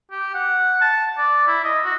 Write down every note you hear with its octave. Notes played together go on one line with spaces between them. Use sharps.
G4
F#5
A5
D5
E4
D#5
F#4